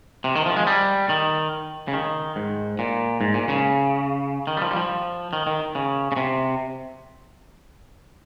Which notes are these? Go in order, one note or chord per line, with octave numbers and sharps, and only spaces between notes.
C3
D#3
F3
G#3
G3
D#3
C#3
D#3
G#2
A#2
G#2
A#2
C#3
D#3
G3
F3
G3
F3
D#3
D#3
C#3
C#3
C3